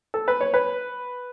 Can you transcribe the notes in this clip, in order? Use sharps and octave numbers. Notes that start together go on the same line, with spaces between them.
A4
B4
C#5
B4